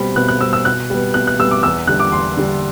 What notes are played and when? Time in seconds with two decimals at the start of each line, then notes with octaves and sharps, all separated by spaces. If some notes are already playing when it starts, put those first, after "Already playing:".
Already playing: B2 G3 C4 B5
0.16 B2 F#6
0.28 F#6
0.41 G3 C4 E6
0.53 E6
0.65 B2 F#6
0.90 G3 B3
1.14 B2 F#6
1.27 F#6
1.39 G3 B3 E6
1.51 D6
1.63 E2 E6
1.87 D3 G3 D4 F#6
2.00 D6
2.12 E2 C6
2.37 D3 G3 D4